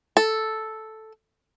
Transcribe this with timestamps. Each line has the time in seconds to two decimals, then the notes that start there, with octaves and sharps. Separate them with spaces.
0.17 A4